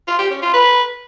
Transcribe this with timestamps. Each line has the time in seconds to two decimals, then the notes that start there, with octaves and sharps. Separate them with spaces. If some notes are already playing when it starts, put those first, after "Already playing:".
0.07 F4
0.19 G4
0.30 C#4
0.42 F4
0.53 B4